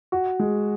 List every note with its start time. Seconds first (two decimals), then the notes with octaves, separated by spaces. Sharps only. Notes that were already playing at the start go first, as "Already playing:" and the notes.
0.12 F#4
0.39 G#3